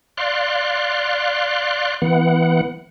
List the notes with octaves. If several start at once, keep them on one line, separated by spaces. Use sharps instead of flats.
D5 F5 C6 F#6
E3 B3 F#5